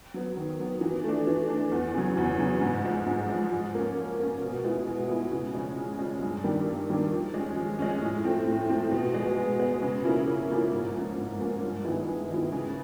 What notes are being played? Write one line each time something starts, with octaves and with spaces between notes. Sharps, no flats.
F#3 B3
D#3
F#3 B3
E3
A3 D4
E3
A3 D4
E2
C#3 F#3
E2
C#3 F#3
G#2
F3 G#3
G#2
F3 G#3
F3
A#3 C#4
F3
A#3 C#4
B2
G#3 B3 E4
B2
G#3 B3 E4
C#3
F3 G#3 C#4
C#3
F3 G#3 C#4
G2
D#3 G3 A#3 D4
G2
D#3 G3 A#3 D4
F3
G#3
C#4
F3
G#3 C#4
A2
F3 A3 C4
A2
F3 A3 C4
B2
G#3 B3
B2
G#3 B3
C#3
F3 A#3 C#4 E4
C#3
F3 A#3 C#4 E4
G#2
F3 A#3 C#4
G#2
F3 A#3 C#4
G2
D#3 G#3 B3 E4
G2
D#3 G#3 B3 E4
C#3